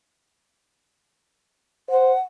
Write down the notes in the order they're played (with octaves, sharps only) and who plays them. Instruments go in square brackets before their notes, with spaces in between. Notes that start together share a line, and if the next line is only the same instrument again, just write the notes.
[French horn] C5 [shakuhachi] F#5